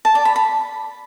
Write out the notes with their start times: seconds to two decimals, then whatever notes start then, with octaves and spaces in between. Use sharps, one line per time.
0.05 A5
0.15 D5
0.25 B5
0.36 B5